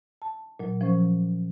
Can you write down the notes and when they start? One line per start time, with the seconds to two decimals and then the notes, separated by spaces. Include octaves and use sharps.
0.22 A5
0.59 A#2 F#3
0.81 F3 C#4 C5 C#6